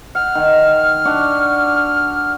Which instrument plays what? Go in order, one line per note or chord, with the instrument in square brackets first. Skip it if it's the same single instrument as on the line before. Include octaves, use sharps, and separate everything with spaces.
[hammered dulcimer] F#5 [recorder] F6
[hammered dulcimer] D#3
D4 F#4 F#5